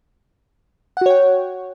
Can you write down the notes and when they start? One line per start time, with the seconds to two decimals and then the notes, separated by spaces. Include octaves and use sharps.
0.97 F#5
1.01 F#4
1.06 C#5
1.10 G5